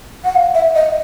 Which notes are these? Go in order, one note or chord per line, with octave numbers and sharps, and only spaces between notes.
F#5
F5
E5
D#5